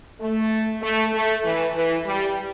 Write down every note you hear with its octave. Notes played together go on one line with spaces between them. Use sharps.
A3
A3
A3
E3
E3
G3